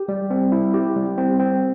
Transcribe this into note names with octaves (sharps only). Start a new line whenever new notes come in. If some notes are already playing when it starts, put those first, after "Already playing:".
Already playing: G4
G3
C4
E4
G4
G3
C4
C4